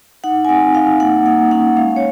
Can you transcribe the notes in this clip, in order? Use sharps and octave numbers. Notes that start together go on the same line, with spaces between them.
D#4 F#5
G#5
C4 F#5
D#4 F5
A#3 F#5
A#3 F#5
C#4 F#5
G#3 F5
C#5